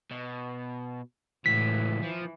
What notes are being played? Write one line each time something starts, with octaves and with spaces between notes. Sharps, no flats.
B2
C#2 A2 E3 B6
E3 F3